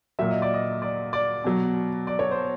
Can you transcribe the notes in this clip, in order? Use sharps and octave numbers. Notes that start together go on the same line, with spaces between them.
A#2 F#3 E5
D#5
D5
D#5
D5
D5
B2 F#3
D5
C#5
C5